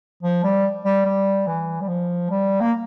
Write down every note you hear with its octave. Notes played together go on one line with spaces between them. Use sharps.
F3
G3
G3
G3
E3
G3
F3
G3
A#3